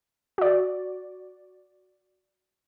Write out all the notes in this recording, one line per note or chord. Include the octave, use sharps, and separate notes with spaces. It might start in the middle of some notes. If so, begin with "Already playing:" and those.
F#4 D5